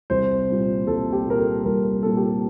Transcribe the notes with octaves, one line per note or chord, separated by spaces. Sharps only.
C2 C5
A#2 G3 A#3
C2 A4
G4
A#2 G3 A#3 A#4
A4
C2 A#4
A#4
A#2 G3 A#3 A4
G4
A4